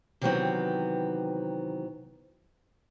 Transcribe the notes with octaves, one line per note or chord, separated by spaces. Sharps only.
C3 D#3 E3 F#3 B3 C4